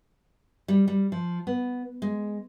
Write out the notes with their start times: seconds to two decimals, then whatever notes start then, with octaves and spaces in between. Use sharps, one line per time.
0.68 G3
0.88 G3
1.12 F3
1.47 B3
2.02 G#3